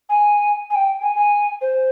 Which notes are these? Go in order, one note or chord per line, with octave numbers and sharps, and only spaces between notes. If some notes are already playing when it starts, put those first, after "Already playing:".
G#5
G#5
G5
G#5
G#5
C5